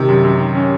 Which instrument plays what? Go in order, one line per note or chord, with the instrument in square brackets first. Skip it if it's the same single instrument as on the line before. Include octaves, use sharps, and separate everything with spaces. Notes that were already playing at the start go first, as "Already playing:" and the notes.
Already playing: [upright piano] C3 [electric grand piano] D#3
[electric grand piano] F#2
F#2
D#3
C#4